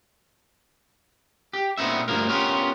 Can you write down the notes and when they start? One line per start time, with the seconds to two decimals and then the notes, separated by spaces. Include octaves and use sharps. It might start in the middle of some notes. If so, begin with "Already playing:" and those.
1.53 G4
1.78 A#2 B3 C4 D#4 E5
2.08 D2 G2 F3 A#3 A#4
2.28 B3 C#4 F4 G4 A#4